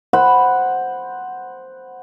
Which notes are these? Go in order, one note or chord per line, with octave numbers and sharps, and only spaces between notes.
C5 F#5 B5